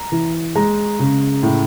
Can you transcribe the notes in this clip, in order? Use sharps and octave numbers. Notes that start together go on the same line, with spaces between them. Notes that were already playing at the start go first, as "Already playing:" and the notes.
Already playing: A#5
E3
G#3 A#5
C#3
A2